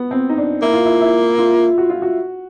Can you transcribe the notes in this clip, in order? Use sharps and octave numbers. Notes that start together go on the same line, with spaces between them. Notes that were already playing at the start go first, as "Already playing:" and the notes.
Already playing: B3
C4
D#4
D4
A#3 E4
F4
E4
E4
F4
F#4
F4
F#4